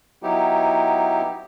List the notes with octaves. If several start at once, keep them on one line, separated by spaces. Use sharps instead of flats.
F#3 B3 D#4 E4 G4